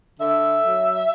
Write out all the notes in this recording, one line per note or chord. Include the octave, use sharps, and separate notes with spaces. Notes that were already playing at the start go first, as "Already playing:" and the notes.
D3 E5
F#3